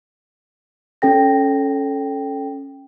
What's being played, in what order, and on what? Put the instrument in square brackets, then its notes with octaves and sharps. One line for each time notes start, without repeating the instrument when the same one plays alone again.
[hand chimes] C#4 A4 G5 A#6